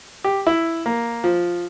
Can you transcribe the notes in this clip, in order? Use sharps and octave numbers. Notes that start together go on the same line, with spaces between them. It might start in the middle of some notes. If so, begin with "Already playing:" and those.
G4
E4
A#3
F3